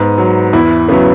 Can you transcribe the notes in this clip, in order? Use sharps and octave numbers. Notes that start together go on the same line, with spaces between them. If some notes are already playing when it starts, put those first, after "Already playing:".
Already playing: G#2 B3
F#3
E2 E4
C#3 F#3 B3